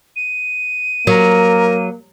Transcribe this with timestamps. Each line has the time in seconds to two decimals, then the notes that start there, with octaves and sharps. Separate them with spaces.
0.16 D#7
1.07 F#3 A#3 A#4